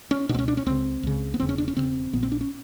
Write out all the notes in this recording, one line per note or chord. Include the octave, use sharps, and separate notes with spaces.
C#4
C#2 B2 C4 D4
C#4
D4
C#4
C#2 C#3 C4
C#2 C#3
B3
E1 E2 C#3 C4
C#4
D4
C#4
E1 E2 C#3 C4
A#1 A#2 B3
C4
D4
C#4